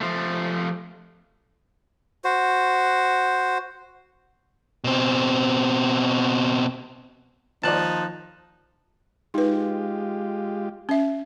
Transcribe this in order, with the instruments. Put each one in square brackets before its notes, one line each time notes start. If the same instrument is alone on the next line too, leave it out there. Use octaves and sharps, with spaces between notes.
[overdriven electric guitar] F3 A3
[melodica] F#4 C5
[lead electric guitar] B2 C4
[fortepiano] D#2 C5 D5 [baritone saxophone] F3 [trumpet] D#4 [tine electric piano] A5 F#6
[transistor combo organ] G#3 F4 G4 [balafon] D#4 B4
[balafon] C#4 E5